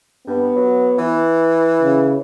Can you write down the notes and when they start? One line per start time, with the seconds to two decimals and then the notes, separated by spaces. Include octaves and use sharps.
0.27 G2 B3
0.56 F#3
0.98 E3
1.82 C#3